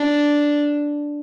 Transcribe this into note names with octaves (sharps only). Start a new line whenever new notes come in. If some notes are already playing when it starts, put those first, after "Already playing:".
Already playing: D4